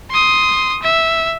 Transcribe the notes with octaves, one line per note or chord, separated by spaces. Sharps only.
C6 D#6
E5